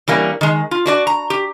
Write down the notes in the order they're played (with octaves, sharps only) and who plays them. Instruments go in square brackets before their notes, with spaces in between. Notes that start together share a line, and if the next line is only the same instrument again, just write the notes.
[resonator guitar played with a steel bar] E3 G3 A#3 C#4
D#3 G#3
F4
D4 F#4 D5
A#5
G4